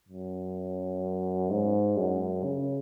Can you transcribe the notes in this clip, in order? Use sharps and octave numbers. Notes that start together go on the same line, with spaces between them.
F#2
G#2
F#2
C#3